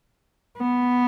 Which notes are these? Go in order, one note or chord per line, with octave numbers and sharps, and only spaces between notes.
B3